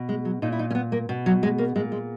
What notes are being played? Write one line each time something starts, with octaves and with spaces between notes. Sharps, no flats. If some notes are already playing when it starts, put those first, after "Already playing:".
Already playing: B2
G#3
F#3
A#2 D#4
E4
D#4
C#4
B3
A#3
B2
F#3
G#3
A#3
A#2 G#3
G#3